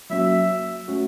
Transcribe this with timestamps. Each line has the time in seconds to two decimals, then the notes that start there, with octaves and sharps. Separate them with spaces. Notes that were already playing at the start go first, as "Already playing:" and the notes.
0.10 F#3 A#3 C#4 F#4 E5
0.88 A3 C#4 F#4